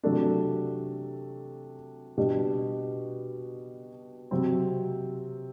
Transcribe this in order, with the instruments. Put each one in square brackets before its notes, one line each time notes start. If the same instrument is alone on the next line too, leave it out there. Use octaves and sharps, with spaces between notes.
[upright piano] C3 F#3 A3 D4
B2 G3 D4 G4
C3 F#3 C4